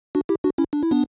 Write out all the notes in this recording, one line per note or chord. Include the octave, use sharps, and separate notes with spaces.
D4 F#4
E4 G4
D4 F#4
C#4 E4
D4
E4
B3 D4